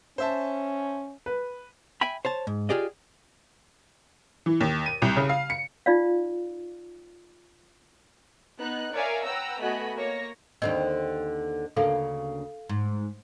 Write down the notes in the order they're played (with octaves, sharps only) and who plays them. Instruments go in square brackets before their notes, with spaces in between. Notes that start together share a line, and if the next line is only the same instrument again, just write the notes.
[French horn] C#4 [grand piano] C5 E5 A5
[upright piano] B4
[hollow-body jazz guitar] E5 G5 G#5 B5
C5 C#5 A5
G#2
F4 G4 G#4 D5 D#5
[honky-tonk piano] E3
D#2
D#7
C2
C#3
F5
C#7
[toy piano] D#4 F4 D5 F5
[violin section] B3 D#4 F#6
A#4 C#5 D5 E5 F5 G#5
B4 F#5 G5 A#5 E6
A3 B3 F#4 D#5 G#5 B5
A#3 C#5 A#6
[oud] D#2 D3 C4 [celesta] D#5
[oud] D2 C#3 A#3 [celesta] A4 F5
[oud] G#2